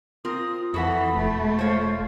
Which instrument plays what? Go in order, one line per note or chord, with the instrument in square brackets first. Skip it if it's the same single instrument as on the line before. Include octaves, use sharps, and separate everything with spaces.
[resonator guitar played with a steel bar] C4 A#4 [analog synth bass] F4 [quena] D#6
[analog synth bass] F2 [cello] E3 [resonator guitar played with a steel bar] F#4 A4 F#5 [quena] B5
[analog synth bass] E1 [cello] A3
[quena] F4 [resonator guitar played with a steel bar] C5 C#5